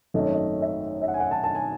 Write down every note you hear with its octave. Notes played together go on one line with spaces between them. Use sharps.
G#1 F#2 D#3 A3 C#4 D#5
C#5
D#5
E5
E5
F#5
G#5
F#5
A5
A5
G#5